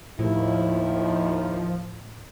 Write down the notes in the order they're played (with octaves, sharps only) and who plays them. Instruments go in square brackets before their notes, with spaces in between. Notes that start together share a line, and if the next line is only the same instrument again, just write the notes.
[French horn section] D#2 [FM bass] A2 [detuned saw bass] F3 [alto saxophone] E4